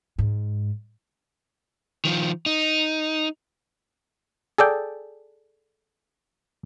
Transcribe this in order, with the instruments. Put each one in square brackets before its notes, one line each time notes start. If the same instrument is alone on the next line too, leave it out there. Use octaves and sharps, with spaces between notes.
[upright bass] G#2
[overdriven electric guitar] D#3 F3
D#4
[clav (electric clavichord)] G#4 A4 D5 G5